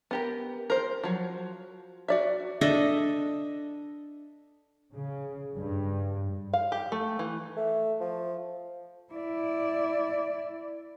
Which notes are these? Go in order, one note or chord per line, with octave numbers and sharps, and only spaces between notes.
B3 G4 A#4
A#4 C5
F3 F#3
F#4 D5 E5
D4 A4 D#5 E5
C#3
G2
F5
G4
A3
E3
A3
F3
E4 D5